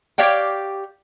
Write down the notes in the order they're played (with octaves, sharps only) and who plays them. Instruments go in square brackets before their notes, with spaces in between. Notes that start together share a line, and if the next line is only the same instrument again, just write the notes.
[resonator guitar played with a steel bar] G4 C#5 D5 F5 G5